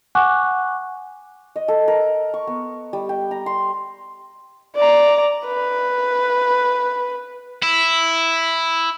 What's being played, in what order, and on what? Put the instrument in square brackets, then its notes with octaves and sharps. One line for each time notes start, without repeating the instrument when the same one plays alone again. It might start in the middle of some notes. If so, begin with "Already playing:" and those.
[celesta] F#5 G#5 C#6 D6 F#6
[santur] D#5
A4
A#4
C#6
B3
G3
G5
A#5
C6
[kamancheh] D5 A#5
B4
[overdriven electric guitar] E4